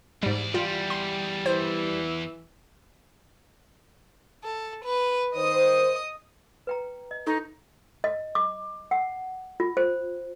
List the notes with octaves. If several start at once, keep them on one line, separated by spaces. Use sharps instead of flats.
E2 G#2 G3 D5
G3 F4
C6
E3 C5
A4
B4
D#3 C5 D#5 D#6
B4 G5 A#5
D#5
D#4 A4 C#6
D#5
D6
F#5
F4
C5